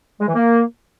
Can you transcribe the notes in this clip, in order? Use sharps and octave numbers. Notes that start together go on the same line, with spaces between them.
G#3
E3
A#3